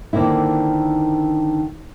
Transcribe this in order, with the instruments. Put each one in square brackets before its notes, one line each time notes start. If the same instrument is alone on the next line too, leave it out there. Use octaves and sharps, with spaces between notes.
[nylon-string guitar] D3 D#3 A#3 C4 E4